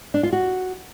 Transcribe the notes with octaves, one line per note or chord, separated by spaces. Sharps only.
D4
F4
F#4